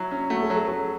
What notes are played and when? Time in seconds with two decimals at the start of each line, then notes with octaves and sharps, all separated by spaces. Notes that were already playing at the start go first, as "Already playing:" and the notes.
Already playing: F#3 E4
0.12 C#4
0.30 A3 F#4
0.43 G#4
0.50 F#3
0.56 G#4
0.68 F#3 A4